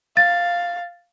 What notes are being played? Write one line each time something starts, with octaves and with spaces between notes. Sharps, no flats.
F5 A6